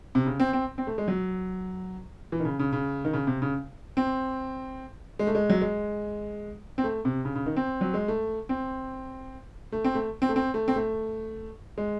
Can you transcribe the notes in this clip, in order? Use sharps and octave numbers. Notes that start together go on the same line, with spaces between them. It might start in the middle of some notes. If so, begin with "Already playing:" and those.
C3
C#3
C4
C4
C4
A3
G#3
F#3
E3
D#3
C#3
C#3
C#3
D#3
C#3
C3
C#3
C4
G#3
A3
G#3
F#3
G#3
C4
A3
C3
C#3
C#3
D#3
C4
F#3
G#3
A3
C4
A3
C4
A3
C4
A3
C4
A3
C4
A3
G#3